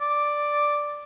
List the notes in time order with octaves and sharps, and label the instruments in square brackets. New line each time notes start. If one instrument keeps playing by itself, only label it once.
[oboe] D5